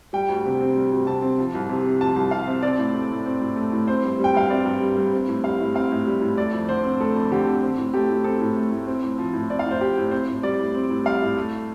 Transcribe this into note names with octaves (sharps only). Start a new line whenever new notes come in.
G3 G5
D2
C3
C4
G3
D2
C3 A5
C4
F3
C2
C3
C4
F3 A5
C2
C3 F5
C4
C4 D5
A2
A3
A2
C4
A2
A3
A2
C4 C5
G2
G3
G5
G2 F5
C4 D5
G2
G3
G2
C4
A2
G3 F5
A2
C4 F5
A2
G3
A2
A3 D5
F2
D3 C5
C4
A3 A4
F2
D3 G4
C4
C4
A2
A3 G4
A2
C4 A4
A2
A3
A2
C4
A2
F3
A2
C4 D5
F5
A2
C5
F3 G4
A2
C4 C5
A2
G3 D5
A2
C4
A2
G3 F5
A2
A3